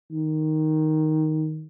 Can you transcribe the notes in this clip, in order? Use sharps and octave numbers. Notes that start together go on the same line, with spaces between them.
D#3